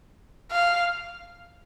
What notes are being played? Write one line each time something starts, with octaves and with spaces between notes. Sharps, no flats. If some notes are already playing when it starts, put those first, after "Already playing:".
F5